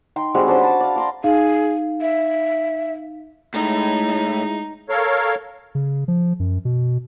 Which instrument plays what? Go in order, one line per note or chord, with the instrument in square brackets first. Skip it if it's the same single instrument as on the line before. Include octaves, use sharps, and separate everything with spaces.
[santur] D#4 G5 C6
G3 G#3 C4 F#4
C#4 D4 C5 C6
A5 B5
D5 F5
A#5 C6 D6
[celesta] D#4 F5 [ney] G#4
[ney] E5
[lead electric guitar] A2 [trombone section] G#3 E4 [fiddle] D#4
[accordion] A4 A#4 C#5 F5
[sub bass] C#3
F3
F#2
B2